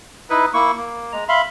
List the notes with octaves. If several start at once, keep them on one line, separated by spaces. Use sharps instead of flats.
D#4 E4 B4
A#3 E4 C#6
A#3
G#3 A#5
E5 F5 B5 C6